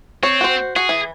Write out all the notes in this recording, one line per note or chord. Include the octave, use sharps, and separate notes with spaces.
C4 C#5
F#4 C5
F#4 G#4
E3